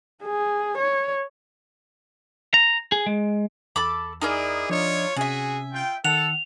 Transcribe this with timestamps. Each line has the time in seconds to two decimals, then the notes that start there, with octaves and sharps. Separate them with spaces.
0.23 G#4
0.78 C#5
2.54 A#5
2.92 G#4
3.06 G#3
3.76 E2 A4 B5 D6
4.22 D#4 E4 G#4 A#4 D5
4.70 F3 D4 F4 C#5 D#5
5.16 C3 C#4 F#4 G#4 E5 G#5
5.73 F4 G5
6.05 D#3 A4 F#5 F7